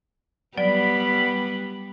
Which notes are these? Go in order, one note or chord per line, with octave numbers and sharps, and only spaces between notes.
F#3 G3 B3 D5 B5